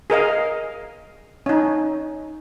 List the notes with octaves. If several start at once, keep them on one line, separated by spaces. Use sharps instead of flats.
G#4 A#4 D#5 F5
C#4 D#4